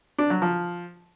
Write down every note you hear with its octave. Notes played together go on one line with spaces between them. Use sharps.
D4
F#3
F3